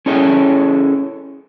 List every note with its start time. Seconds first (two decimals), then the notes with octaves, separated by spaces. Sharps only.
0.06 C#4 E4 G#4 A4 C#5 G5